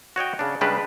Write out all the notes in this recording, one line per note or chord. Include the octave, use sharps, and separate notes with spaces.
F#4 C#5 D#5 G5
C#3 D4
C#3 G3 G#3 D4 G4 B4